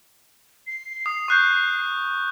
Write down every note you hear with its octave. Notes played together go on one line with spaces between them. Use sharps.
C7
D#6
C#6 F#6 G6